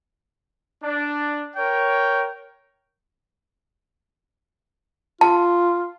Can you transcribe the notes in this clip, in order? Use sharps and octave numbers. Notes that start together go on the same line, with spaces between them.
D4
A#4 C#5 G5
F4 A5